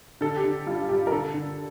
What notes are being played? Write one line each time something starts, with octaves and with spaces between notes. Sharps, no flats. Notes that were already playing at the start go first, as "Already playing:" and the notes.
D3 A4
G4
D3
G2 F4
G2 G4
A#4
D3 A4
D3